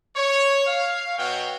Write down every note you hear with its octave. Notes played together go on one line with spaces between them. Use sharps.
C#5
F5
B2 F#3 F#4 C#5 F#5 G5